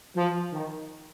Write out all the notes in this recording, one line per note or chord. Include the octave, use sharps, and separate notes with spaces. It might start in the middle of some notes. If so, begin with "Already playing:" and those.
F3
D#3